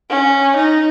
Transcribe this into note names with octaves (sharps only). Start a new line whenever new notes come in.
C#4
D#4